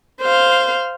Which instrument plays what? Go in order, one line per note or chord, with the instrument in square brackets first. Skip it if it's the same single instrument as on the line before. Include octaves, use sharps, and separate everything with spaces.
[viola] C5 F5